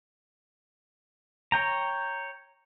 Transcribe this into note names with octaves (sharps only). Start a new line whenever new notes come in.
C#5 G5 A#5